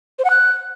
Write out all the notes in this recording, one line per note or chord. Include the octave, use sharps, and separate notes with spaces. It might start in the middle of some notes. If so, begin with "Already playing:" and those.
C5
F#5
F#6